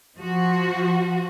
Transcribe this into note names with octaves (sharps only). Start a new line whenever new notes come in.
F3 F#4